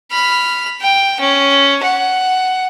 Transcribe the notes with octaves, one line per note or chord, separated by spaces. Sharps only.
B5 F6
G5
C#4
F#5